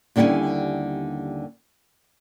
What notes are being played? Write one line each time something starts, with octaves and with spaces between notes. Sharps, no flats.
D#2 D3 G3 C#4 E4 G#5